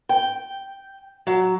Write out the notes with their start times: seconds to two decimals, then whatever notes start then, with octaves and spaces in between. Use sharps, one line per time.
0.09 G5
1.27 F#3